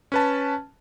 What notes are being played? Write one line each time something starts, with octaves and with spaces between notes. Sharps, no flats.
C#4 B4 A5